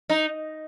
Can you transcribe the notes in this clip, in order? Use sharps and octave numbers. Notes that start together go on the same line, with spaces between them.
D#4